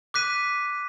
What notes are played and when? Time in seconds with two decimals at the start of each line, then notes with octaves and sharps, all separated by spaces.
0.14 D6 F#6 B6 D#7